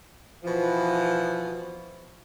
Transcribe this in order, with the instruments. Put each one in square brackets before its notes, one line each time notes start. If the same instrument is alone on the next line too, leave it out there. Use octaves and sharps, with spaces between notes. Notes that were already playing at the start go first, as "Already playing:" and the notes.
[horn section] B2 E3 F3